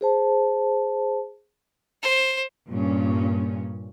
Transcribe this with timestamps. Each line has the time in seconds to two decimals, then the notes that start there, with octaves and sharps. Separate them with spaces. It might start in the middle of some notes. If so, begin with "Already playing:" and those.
0.01 G#4 C5 A5
2.03 C5
2.69 G2 A#2 C#4